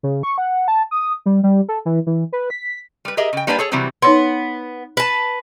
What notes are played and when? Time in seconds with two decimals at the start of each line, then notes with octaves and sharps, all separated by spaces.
0.03 C#3
0.23 C#6
0.38 F#5
0.68 A5
0.91 D#6
1.26 G3
1.43 G3
1.68 A4
1.85 E3
2.06 E3
2.32 B4
2.50 B6
3.05 G3 B4
3.17 G4 G#4 A#4 D#5 E5
3.33 C#3 G5
3.47 G3 A#3 D4 B4 D5 G#5
3.59 G#4 A4 C#5
3.72 C3 E3 F#3 G3 C4
4.02 B3 D#4 C#5 C6
4.97 B4 A5